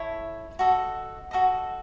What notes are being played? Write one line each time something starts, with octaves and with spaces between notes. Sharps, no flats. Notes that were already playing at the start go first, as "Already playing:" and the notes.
Already playing: E4 A4 C#5
F#4 A4 D#5
F#4 A4 D#5